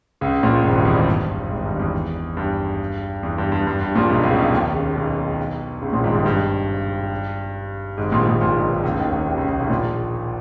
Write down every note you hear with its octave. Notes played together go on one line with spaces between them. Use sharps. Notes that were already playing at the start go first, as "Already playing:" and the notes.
C#2 C#3
A#1 A#2
G#1 G#2
G2
E2
G2
G#1 G#2
G2
E2
G2
E2
G2
G2
G2
G2
A#1 A#2
B1 B2
C#2 C#3
B1 B2
D#2 D#3
C#2 C#3
B1 B2
C#2 C#3
A#1 A#2
G#1 G#2
G2
G2
G#1 G#2
A#1 A#2
A#1 A#2
A#1 A#2
B1 B2
C#2 C#3
D#2 D#3
D#2 D#3
D#2 D#3
C#2 C#3
C#2 C#3
B1 B2
A#1 A#2